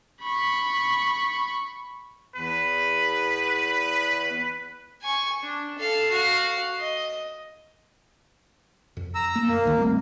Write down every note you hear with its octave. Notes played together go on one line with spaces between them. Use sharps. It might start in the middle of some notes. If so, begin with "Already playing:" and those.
B5 C#6
E2 B4
G#5 C#6
D4
A4 F5
F#4 F5
D#5
F2
A#5 E6
A#3
F#2 A#3
D2 G#2 D#3
G3 A3 C4